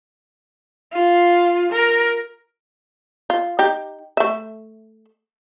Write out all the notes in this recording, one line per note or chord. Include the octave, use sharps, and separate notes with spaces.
F4
A#4
F4
D#4 G4
A3 E5